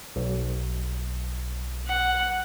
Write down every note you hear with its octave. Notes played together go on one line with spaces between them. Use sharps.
B1
F#5